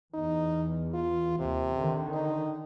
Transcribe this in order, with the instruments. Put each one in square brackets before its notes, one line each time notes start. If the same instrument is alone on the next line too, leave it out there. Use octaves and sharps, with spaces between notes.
[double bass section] E2 [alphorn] D#4
[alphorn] F4
[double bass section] D#2 [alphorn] C3
[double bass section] D3 D#3
[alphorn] D#4